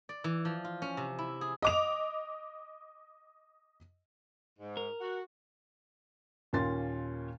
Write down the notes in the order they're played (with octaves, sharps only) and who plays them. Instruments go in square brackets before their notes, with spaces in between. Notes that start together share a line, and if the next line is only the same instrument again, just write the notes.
[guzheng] D5
E3
F3
F4
C#4
C3
E4
G#4
[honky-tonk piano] D#5 D6 F7
[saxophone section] G#2
[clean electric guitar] A#4
[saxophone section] F#4
[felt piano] D#2 A#2 C#4 C6 A6